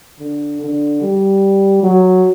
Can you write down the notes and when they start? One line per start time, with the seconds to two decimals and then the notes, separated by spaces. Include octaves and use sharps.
0.19 D3
0.61 D3
1.01 G3
1.83 F#3